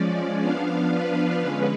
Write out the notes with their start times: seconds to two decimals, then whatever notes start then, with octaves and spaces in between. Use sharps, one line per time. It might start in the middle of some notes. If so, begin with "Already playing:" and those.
Already playing: F3 G#3 C#4 D5
0.40 F3 B3 D4 F5
0.91 B4
1.41 D3 G#3 C#4 B4